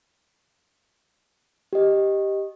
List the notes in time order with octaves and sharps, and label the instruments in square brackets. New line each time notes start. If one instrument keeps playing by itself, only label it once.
[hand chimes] G4 D#5